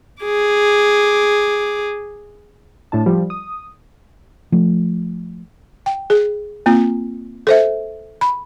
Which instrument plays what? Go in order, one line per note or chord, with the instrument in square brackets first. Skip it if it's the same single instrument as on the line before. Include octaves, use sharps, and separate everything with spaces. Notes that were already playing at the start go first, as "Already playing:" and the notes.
[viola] G#4 D6
[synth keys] A2 D4 A5
F3 G3
D#6
[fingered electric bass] F3 A3
[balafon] G5
G#4
A#3 C4 F4
A4 C5 E5
B5